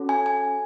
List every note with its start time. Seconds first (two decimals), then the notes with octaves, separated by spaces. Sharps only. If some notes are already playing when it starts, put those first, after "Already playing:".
Already playing: C#4 F#4 A4
0.09 G#5
0.26 G#5